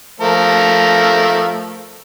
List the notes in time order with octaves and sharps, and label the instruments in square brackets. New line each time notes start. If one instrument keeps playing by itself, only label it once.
[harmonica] F3 A3 A#4